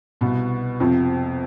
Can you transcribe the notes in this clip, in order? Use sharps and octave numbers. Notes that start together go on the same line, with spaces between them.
C2 B2 B3
F2 C3 F3 C4